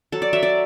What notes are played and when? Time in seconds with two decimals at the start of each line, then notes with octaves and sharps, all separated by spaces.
0.12 F#3 A4
0.22 D5
0.33 F#3 E5
0.43 D5